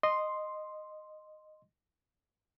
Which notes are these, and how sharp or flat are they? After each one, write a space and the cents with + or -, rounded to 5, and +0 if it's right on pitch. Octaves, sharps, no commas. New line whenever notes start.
D#5 -10 C6 +0